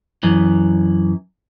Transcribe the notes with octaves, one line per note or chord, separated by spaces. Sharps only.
F#2 E3